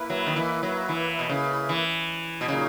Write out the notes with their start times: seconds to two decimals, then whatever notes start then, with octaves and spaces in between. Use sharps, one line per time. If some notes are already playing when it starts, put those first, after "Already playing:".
Already playing: A#3 E4 B4
0.10 F#3
0.26 D#3
0.36 E3
0.63 F#3
0.89 E3
1.19 B2
1.29 C#3
1.69 E3
2.41 B2
2.48 A#2 C#3 F#3 A#3 D#4